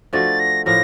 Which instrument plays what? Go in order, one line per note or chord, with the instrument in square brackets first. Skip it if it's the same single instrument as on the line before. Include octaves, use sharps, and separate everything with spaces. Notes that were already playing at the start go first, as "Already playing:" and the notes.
[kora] F3 A3 D4 F#4 [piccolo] A6
[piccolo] A#6
[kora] A2 F3 A#3 [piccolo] A#6